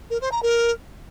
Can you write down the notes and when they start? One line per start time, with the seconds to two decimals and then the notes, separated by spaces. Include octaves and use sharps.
0.10 A#4
0.21 C5
0.31 A#5
0.42 A#4